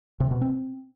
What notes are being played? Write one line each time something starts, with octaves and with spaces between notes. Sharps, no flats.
C3
B2
C4